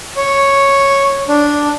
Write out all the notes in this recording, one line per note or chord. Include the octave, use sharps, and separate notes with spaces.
C#5
D4